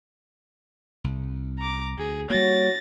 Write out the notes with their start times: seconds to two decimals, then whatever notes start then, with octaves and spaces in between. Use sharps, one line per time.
1.04 C2
1.59 A#5 D6
1.98 D2 G#4
2.30 G3 A#3 F#4 C#5 A6 A#6